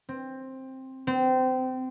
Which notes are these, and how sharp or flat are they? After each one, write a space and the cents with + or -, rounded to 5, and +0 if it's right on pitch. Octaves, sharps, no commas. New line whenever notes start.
C4 +10
C4 -25